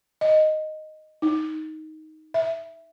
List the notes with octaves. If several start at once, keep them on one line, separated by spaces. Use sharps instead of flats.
D#5
D#4
E5